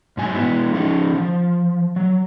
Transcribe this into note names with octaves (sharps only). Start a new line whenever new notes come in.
G#2 F#3 G#5
G#3 B3 E4
F3 C#4 D#4
F3
F#3